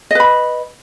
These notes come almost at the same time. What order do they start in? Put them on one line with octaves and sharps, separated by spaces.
D#5 B4 B5